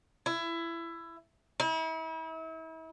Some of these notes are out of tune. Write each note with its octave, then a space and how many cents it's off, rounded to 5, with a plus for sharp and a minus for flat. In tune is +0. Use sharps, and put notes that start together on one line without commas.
E4 +20
E4 -40